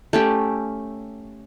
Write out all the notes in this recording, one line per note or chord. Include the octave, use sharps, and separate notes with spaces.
A3 C#4 G4